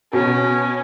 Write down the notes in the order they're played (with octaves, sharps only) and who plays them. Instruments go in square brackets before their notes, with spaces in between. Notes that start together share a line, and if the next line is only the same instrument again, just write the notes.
[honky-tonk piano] B2 [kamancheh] C#4